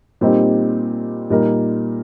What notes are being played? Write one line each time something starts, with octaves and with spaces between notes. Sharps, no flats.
A#2 G3 C4 D#4 G4
A#2 G3 D#4 A#4